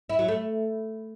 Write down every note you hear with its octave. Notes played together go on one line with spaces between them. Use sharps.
E4
F#3
A3